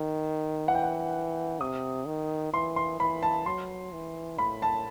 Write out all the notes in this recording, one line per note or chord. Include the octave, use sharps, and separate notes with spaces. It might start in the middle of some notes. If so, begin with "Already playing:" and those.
Already playing: D#3
E3 F#5
G5
F#5
C3 D#6
D#3
E3 C6
C6
E3 B5
A5
F#3 C6
E3
A2 B5
A5